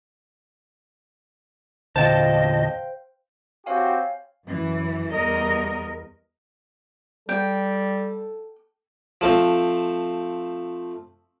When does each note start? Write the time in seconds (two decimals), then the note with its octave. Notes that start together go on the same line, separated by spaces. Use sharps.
1.96 E2 A#2 D3 C5 D#5 F5 G5 A5
3.66 C4 F#4 G4 C#5 F5 G#5
4.43 F#2 E3
5.10 E2 G3 A#4 D#5
7.29 G3 A4 G5
9.21 F3 A3 C4